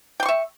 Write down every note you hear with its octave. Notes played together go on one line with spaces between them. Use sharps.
E5 G5 C6 C#6